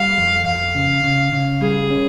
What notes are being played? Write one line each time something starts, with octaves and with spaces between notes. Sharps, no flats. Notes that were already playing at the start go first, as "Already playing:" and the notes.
Already playing: G3 F5
F2
F2 F5
C#3
C#3
C#3
G3 G#4
C#4